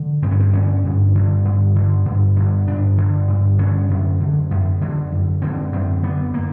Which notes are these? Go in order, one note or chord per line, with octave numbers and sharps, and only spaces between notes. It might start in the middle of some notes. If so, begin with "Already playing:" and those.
Already playing: D3
G2 C4
C#4
C4
D3 C#4
G2
D3
G2
D3
G2
D3
G2 D4
D3
G2
D3 C#4
F#2
D3
F#2
D3
F#2
D3 C4
F#2 C4
D3 B3
A#3